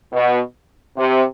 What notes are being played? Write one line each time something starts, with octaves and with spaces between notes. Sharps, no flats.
B2
C3